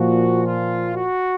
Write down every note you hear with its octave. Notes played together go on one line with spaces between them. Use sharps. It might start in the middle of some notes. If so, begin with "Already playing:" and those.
Already playing: A#2 F3 F#4
F4
F#4